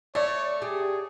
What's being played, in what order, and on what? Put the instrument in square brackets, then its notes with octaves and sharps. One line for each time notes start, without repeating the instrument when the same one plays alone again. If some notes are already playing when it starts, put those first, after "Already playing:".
[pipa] A3 [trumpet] C#5 [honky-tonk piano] D5
[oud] G4 [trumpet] G#4